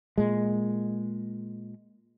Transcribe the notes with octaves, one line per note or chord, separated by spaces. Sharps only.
A#2 G#3